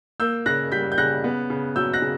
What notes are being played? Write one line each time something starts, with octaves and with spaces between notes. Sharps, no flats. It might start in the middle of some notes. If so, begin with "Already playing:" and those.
A#3 E6 G6
C#3 F#6 A#6
G3 G6 B6
G6
C#3 F#6 A#6
B3
C#3
F#3 E6 G6
F#6 A#6
C#3